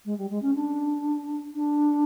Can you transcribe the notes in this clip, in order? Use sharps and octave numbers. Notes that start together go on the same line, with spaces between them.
G#3
G3
G#3
C#4
D4
D4